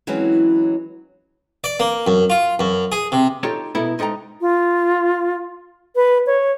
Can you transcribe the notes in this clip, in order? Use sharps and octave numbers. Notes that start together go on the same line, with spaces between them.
E3 F#3 G#3 C4 C#4 E4
D5
A#3
F#2
F4
F#2
G#4
C3
D#4 F4 G4 A4 C#5
B2 B3 E4 A4 A#4 B5
G#2 D#4 A4 G5 A#5
F4
B4
C#5